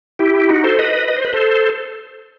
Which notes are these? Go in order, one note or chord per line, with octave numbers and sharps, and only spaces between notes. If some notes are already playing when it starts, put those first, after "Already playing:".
E4 G4
D#4 F#4
A4 C5
B4 D#5
D#5
C5
B4
A4 C5